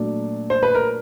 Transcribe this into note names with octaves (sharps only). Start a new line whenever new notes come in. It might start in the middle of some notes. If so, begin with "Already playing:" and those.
Already playing: A#2 F#3 A3 D4
C5
B4
A#4